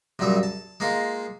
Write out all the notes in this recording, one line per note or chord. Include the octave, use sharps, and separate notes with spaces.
A#1 F#2 A#2 G3 E5
A5
G#3 A#3 D#4 F4